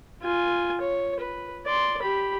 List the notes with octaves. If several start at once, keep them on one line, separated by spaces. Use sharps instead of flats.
F4 G#5
C#5
B4
D5 C6
G4 B5